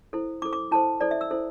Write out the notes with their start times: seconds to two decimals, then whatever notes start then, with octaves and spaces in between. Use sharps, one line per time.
0.13 E4 A4 C5
0.42 E4 D6
0.45 A4 C5
0.53 D6
0.71 E4 A4 C5 A5
1.01 E4 A4 C5 D5
1.11 E5
1.21 E6
1.31 E4 A4 C5